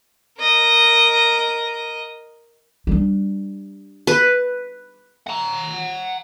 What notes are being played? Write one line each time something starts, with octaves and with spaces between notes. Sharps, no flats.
A#4 D#5
G3 D4
B4
F#5 A#5